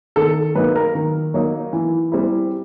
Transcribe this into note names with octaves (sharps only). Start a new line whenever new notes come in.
D#3 A4
F#3 A#3 D#4 B4
A#4
D#3
F#3 A#3 D#4
E3
G3 C4 E4